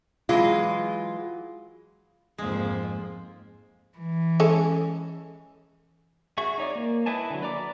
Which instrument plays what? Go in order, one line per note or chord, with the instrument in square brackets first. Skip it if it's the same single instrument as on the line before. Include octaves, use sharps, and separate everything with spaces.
[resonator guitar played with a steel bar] E3 F#3 G#3 F4
[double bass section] F2 G#2 [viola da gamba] F3 A#3 [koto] G#3
[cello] E3
[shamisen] G#3 C#4 A4
[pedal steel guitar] F#4 G#4 E5 C#6
D#4 C#5 D5
A#3
E4 B4 D#5 G#5 A5
D3 F#3
B4 D5 A#5 D6